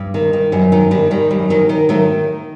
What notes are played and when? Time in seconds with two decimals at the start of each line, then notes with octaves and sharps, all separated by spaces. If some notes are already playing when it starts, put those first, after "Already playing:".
Already playing: G2
0.14 D#3
0.33 D#3
0.52 F#2 G3
0.72 D#3 F#3
0.91 D#3 G3
1.11 D#3 G3
1.31 F#2 G3
1.50 D#3 F#3
1.69 D#3
1.89 D#3 F#3 A3